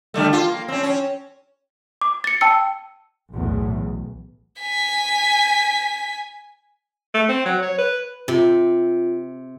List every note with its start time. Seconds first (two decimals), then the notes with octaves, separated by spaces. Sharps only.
0.14 D3 G3 A3
0.33 F4
0.48 A#3
0.68 C4 C#4
0.83 C#4
2.01 D6
2.24 A6 C#7
2.41 G5 A5 E6 C#7
3.32 B1 E2 A2
4.61 G#5 B6
7.14 A3
7.29 C4
7.46 F#3
7.62 C#5
7.78 B4
8.28 C3 F4